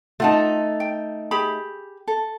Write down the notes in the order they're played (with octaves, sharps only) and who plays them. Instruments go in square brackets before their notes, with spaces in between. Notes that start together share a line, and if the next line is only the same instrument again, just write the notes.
[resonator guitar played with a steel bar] A3 D#4 [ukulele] F4 F#5 A5
[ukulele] G5
G4 G#4 B5
A4